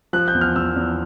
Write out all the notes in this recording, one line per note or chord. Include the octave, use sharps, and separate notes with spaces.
F3 F#6
G6
E2
F6
E2 E6
E2